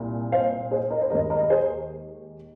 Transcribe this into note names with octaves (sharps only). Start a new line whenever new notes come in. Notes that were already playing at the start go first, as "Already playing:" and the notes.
Already playing: C2 A#2
C5 F5
G#4 C5
A#4 D#5
C5
D#2 D#3 G#3 A#4 D#5
A#4 D#5
D#5
G#4 C5